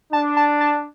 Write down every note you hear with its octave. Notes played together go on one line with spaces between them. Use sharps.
D4 A5
A5
A5